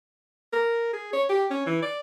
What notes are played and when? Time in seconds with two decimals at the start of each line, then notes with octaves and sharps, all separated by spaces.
0.53 A#4
0.93 G#4
1.13 C#5
1.30 G4
1.51 C#4
1.66 E3
1.83 D5